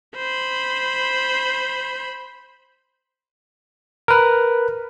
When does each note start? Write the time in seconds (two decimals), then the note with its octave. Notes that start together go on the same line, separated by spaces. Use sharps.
0.16 C5 B5
4.08 A#4 B4